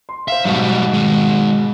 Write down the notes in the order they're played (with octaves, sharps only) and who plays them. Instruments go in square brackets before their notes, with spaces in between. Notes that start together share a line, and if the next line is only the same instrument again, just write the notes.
[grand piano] C6
[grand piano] C5 F5 [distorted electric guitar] E5
[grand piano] G#2 B2 [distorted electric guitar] F#3 G3
[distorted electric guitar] D#3 G#3